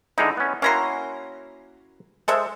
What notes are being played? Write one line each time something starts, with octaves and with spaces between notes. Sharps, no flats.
D3 G#3 D#4 E4
B3 C#4
A#3 C#4 E4 F#4 A#5 C6
G#3 A4 C5 E5